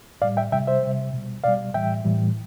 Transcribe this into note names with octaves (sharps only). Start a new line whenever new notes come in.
A2 G3 D5 F5
E5 G5
C3 G3 E5 G5
C5 E5
C3 G3
B2 G3
B2 G3 D5 F5
A2 E3 G3 E5 G5
A2 E3 G3